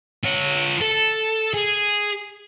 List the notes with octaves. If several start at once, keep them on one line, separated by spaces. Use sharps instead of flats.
F4 C#5
A4
G#4